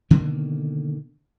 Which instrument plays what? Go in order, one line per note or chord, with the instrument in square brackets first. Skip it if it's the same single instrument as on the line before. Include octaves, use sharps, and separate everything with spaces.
[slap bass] B2 D3 D#3 A#3